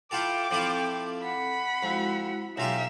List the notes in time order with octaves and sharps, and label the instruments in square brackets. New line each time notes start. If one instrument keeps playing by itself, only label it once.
[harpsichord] E4 F4 A4 [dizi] G5 [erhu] D6
[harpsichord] F3 E4 F4 [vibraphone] C4 A4
[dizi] F#5 [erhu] B5
[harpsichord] F2 [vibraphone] G#3 E4 F#4
[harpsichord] B1 F4 G4 [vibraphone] F#3 G#5 A#5 [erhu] E5